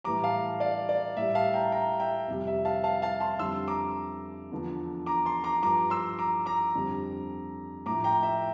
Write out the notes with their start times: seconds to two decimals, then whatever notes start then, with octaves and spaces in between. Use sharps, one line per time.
0.04 A2 E3 G3 A#5 D6
0.24 F5 A5
0.60 D5 F5
0.89 D5
1.17 A2 G3 E5
1.35 F5 A5
1.54 G5 A#5
1.72 G5 A#5
2.00 E5 G5
2.28 F2 C3 G3
2.47 E5
2.65 F5 A5
2.84 F5 A5
3.02 F5 A5
3.21 A5 C6
3.39 F2 D3 G3 C6 E6
3.68 A#5 D6
4.52 E2 D3 F3
5.06 A#5 D6
5.25 A5 C6
5.44 A#5 D6
5.63 G2 F3 A#5 D6
5.90 C6 E6
6.19 A#5 D6
6.46 A#5 D6
6.75 F2 D3 G3
7.86 A2 F3 A#5 D6
8.04 G5 A#5
8.23 E5 G5